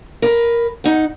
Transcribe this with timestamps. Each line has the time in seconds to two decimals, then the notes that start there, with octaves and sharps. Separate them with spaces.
0.22 A#4 B4
0.84 D#4 F#5